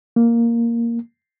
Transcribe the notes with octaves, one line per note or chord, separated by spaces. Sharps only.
A#3